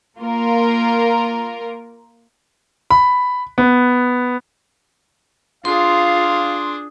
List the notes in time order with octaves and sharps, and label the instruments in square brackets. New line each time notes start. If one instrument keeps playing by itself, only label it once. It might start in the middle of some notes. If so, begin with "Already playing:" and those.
[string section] A#3 F4 A#4
[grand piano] B5
B3
[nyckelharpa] D4 G#4 [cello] F4 [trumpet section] F5 [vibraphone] C6